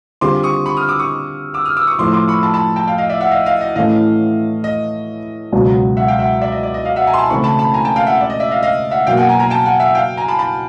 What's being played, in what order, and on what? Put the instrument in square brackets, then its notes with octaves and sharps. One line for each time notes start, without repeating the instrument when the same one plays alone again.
[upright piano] D3 G3 C4 F4 G#4 [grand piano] C6 D6
[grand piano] C#6 D#6
B5 C#6
D#6 F6
D6 E6
C#6 D#6
D6 E6
D#6 F6
D6 E6
C#6 D#6
[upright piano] A2 F3 A3 [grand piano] C6 D6
[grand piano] C6 D6
B5 C#6
A5 B5
A5 B5
G5 A5
F5 G5
D#5 F5
D5 E5
E5 F#5
D#5 F5
D#5 F5
D#5
[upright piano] A2 E3 A3 C#4 [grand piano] D#5 F5
[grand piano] D#5
[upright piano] C#2 B2 F#3
[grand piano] E5 F#5
F5 G5
E5 F#5
D5 E5
D#5
D5
D#5
D#5 F5
E5 F#5
G#5 A#5
C6
A5 B5
[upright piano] C#3 E3 A3 C4 E4 [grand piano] B5 C#6
[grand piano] A5 B5
A5 B5
G#5 A#5
G5 A5
F5 G5
E5 F#5
D5
D#5
D5 E5
D#5 F5
D#5 F5
E5 F#5
[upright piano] B2 F#3 A#3 [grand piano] F5 G5
[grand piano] F#5 G#5
G#5 A#5
G#5 A#5
G5 A5
F#5 G#5
E5 F#5
F5 G5
G#5 A#5
A5 B5
A5 B5